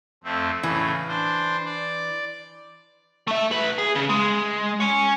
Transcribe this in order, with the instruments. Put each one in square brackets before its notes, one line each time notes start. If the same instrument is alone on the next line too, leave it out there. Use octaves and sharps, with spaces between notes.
[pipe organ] F2 A3 C4
[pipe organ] A2 C#3 [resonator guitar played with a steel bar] E3
[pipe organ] D4 C5
D5
[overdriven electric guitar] A3 E5
A2 B4
G#4
C#3
G#3
C#5 G#5